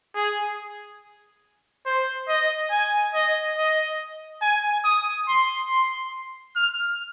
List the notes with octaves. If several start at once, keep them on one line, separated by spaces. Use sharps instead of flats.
G#4
C5
D#5
G#5
D#5
D#5
G#5
D#6
C6
C6
F6